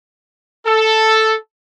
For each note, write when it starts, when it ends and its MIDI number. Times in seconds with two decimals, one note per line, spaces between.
0.66 1.37 69